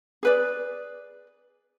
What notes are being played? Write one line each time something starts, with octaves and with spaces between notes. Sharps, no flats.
G#4 B4 D5